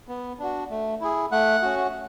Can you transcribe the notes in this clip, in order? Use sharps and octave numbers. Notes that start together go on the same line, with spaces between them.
B3
D4 F#4
A3
E4 G#4
A3 F#5
C#4 F#4